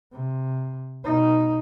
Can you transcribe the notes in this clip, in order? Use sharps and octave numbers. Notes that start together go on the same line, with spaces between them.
C3
B2 D#4